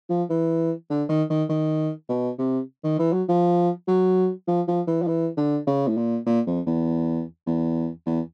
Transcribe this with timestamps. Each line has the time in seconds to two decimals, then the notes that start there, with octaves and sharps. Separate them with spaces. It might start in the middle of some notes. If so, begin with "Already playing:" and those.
0.10 F3
0.30 E3
0.90 D3
1.09 D#3
1.30 D#3
1.49 D#3
2.09 B2
2.38 C3
2.84 D#3
2.99 E3
3.13 F#3
3.28 F3
3.88 F#3
4.48 F3
4.68 F3
4.87 E3
5.02 F3
5.07 E3
5.37 D3
5.67 C#3
5.88 A2
5.97 A#2
6.26 A#2
6.47 F2
6.67 E2
7.47 E2
8.06 E2